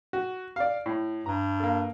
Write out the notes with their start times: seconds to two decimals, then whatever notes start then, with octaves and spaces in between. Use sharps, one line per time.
0.13 F#4
0.56 D5 F5
0.86 A2
1.26 G2 A#5
1.60 A#3 A4